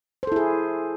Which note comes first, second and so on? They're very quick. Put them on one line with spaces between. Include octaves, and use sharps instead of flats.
C5 A4 E4 G#4